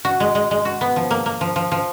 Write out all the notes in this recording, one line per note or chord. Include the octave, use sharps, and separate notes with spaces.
F#4
G#3
G#3
G#3
F#4
B3
F3
A#3
A#3
F3
F3
F3